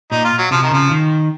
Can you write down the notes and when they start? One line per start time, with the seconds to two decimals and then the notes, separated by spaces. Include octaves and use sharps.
0.12 A#2 D#4
0.25 F4
0.38 F#3
0.51 C3 F3
0.63 D#3
0.71 C#3 F3
0.91 D#3